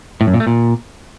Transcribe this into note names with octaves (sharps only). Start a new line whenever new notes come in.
A2
F#2
A#2
A3
A#2